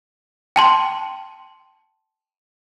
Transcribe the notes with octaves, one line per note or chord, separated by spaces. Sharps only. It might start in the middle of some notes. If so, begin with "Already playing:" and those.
G5 A5 C6